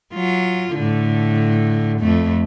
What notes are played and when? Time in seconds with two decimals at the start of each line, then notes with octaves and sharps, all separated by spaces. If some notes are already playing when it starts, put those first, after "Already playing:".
0.13 F#3 F4
0.74 A2 D3
1.99 F2 A3